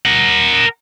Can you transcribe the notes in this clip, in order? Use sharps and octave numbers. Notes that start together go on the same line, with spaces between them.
A#4 F#5